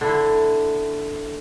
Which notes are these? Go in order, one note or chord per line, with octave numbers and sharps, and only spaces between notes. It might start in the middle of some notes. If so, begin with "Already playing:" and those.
D3 E4